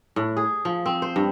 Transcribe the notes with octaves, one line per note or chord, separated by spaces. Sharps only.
A2
G#4
F3
C4
C5
G2